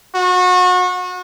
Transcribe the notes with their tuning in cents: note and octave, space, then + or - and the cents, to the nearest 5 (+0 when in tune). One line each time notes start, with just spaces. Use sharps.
F#4 -30